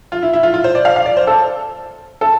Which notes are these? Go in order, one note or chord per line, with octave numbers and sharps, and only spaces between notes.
F4
E4
E4
F4
F4
C5
D5
F5
F5
D5
C5
A4
A4